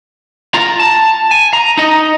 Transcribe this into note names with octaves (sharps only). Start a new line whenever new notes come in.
F4 A#5
A5
G#5
A#5
D#4 D#5